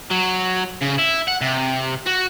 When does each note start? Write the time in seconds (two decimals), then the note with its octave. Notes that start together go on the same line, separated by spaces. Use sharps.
0.11 F#3
0.82 C#3
0.99 E4
1.28 F#5
1.41 C3
2.06 F#4